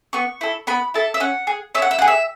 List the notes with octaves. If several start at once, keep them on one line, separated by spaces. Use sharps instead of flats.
B3 C#6
E4 A4
B3 B5
E4 A4 A5
E5
C#4 F#5
G#4
C#4 E5
F#5
E5
G#4 F#5
E5